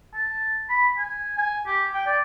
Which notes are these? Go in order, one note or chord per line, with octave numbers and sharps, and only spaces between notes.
A5
B5
G#5
G#5
G4
G5
D5